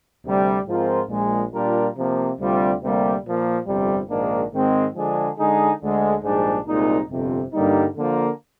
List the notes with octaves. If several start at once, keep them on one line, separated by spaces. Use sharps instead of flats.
D2 C3 G3
G#2 F3 C4 F4 A#4
A#1 A#2 G#3
A#2 G3 D4 F4 A#4
C3 F3 A#3
D2 C3 G3 C4 F4
D2 C3 G3 A#3
A#2 F3 A#3
G1 F2 C3 G3
A#1 G#2 D#3 A#3 D4
G#2 D#3 G#3 C4
D3 F3 G#3 D4 G#4
D3 G#3 D#4 G#4
D2 D3 G#3
A#1 G#2 G3 D4 G#4
C2 A#2 G#3 D#4
G1 F2 C3
G2 D3 G3 A#3 D#4
D3 F3 A#3